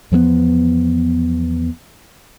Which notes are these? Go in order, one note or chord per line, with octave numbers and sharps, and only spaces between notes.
E2 F3 G3 B3